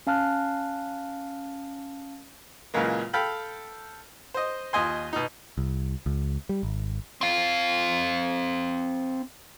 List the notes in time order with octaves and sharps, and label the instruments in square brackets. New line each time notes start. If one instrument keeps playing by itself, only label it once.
[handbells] C#4 F5 A5 F6 F#6
[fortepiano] A#2 C#3 E3 F#3 G#3 A#3
A4 F5 G5 B5
C5 D#5
D#2 F4 D#5 G#5 C6
B2 D#4
[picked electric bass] C2
C#2
G3
G#1
[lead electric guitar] C4 F5